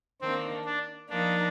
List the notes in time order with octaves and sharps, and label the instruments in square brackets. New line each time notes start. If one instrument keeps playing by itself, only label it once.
[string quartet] D#3 A#3 D4 [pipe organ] C4
[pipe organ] D4
[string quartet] F3 A#3 D#4 [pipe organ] D4